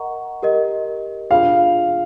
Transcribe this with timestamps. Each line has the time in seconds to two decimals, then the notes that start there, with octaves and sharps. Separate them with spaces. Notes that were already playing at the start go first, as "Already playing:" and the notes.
Already playing: A#4 D#5 F#5 A#5 C#6
0.43 G4 A#4 D#5
1.31 D4 F4 G#4 F5